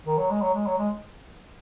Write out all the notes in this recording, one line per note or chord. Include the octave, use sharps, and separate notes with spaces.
D#3
F#3
G#3
F#3
G#3
F#3
G#3